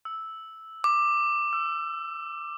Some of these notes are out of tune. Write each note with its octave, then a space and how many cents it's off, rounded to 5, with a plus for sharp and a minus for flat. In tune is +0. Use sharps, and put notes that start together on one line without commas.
E6 -5
D6 +15
E6 +30